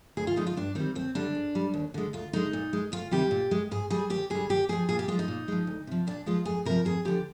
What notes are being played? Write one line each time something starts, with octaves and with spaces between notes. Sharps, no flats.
D2 G#4
F4
D3 F3 G#3 D#4
F4
G2 D4
D#3 G3 C4
D#2 C4
D3 G3 D4
G#2
G3
D#2
D3 G#3
D2 F4
D3 G#3 D#4
A#2
G#3
D2 F4
C3 D#3 G3 G4
A#2
G#3
G#2 G#4
G3 G#4
D#2 G4
D3 G3 G#4
D#2 G4
D3 F3 G#4
A#2 G#4
G4
F3 G#3 F4
D#4
A#2
F3 G#3
D2
C3 F3
A#2 D4
F3 G#3 F4
F2 G#4
C3 F3 A#4
F2 G#4
D3 F3 G4